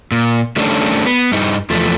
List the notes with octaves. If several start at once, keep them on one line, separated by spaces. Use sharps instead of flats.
A#2
D#3 G3 A3 C#4 D4
B3
G2 G3 D#4
E2 F3 A3